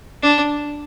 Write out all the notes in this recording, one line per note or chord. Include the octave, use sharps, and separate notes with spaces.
D4